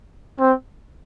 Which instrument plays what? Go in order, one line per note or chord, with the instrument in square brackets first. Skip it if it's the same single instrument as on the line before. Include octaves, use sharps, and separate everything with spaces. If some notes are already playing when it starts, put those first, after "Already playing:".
[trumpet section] C4